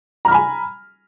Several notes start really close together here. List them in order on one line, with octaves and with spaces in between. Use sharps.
A#5 F6 B5 G#5